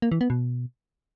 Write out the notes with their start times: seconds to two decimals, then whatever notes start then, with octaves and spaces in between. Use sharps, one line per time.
0.02 A#3
0.12 E3
0.21 B3
0.30 B2